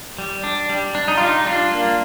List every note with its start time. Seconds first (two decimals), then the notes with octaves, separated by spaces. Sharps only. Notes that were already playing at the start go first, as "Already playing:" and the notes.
0.19 G3
0.44 D4
0.69 G3
0.95 D4
1.08 D#4
1.17 G3 F4
1.27 D#4
1.46 G3 D4 F4
1.72 A#3